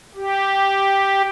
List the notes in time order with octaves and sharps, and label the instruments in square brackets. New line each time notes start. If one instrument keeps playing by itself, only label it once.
[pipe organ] G4